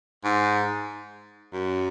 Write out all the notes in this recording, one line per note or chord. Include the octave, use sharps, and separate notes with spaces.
G#2
F#2